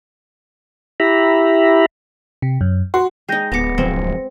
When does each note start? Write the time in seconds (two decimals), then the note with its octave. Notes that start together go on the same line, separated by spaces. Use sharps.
1.00 E4 G4 E5 A#5 B5
2.42 C3
2.61 F#2
2.94 F#4 C6
3.29 G#3 D#4 G5 G6 A#6
3.52 D1 B3 D6 A#6 C#7
3.78 F#1 F3 G#3 C4